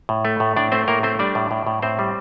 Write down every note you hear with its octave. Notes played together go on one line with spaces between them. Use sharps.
A2
A3
A2
A2 D4 D5
A3 C4 C5
A2 A#3 A#4
A3 C4 C5
G3 D4 D5
A2
A2
A2
A2 C4 C5
G3